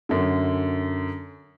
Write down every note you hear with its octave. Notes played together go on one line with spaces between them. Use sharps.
F#2 D3